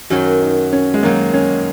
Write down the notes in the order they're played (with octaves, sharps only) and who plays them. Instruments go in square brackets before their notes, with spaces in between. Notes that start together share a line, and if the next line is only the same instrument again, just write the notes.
[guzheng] F#2 D#3 F#3 [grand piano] F#4
[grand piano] D#4
C#4
G#3
[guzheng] D#3 F#3 D#4 [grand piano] A#3
[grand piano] C#4